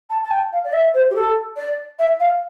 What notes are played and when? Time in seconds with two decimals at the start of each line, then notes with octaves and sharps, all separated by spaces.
0.10 A5
0.24 A5
0.31 G5
0.53 F5
0.64 D5
0.73 E5
0.94 C5
1.10 G4
1.15 A4
1.57 D5
1.99 E5
2.20 F5